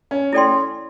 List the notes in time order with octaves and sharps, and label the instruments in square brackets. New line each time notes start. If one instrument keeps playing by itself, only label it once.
[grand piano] C#4
[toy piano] E4 A4 D5 G5 C6